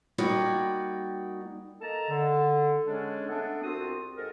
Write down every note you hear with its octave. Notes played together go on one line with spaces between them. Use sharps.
G3 A#3 D#4 F#4 D5 G5
A#3 A4 D#5 A5 A#5
D3
C#3 G#3 C#4 D4 A4
A3 B3 D4 A4
C2 C4 F4 F#4 D#6
G#2 A4 A#4